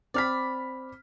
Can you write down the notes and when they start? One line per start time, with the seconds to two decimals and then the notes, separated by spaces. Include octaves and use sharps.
0.14 C4 D5 B5 F6 B6